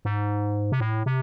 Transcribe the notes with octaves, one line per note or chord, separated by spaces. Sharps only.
G#2
C3
A2
C3